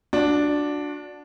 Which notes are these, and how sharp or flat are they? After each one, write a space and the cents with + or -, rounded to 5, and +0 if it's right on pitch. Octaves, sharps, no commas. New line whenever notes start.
D4 +0 F#4 -30